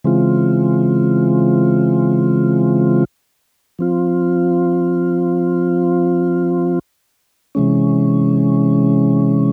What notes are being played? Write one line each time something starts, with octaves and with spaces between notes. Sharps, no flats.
C#3 E3 G#3 C4 F4
F3 C4 F4
C3 E3 G#3 C#4